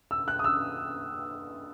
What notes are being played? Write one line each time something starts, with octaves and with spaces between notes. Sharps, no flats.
E6
F#6
D#6
E6